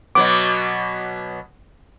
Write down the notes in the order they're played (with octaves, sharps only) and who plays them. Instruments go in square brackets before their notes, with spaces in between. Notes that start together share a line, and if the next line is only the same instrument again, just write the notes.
[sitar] B2 F#3 B3 [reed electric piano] D6